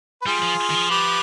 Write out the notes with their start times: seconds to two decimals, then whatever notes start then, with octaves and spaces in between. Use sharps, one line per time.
0.22 B4
0.26 G3 F4 G#4
0.43 F3
0.70 D#3
0.75 F3
0.90 G4 B4